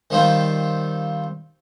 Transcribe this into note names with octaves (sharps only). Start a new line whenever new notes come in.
D#3 F3 G3 C4 F4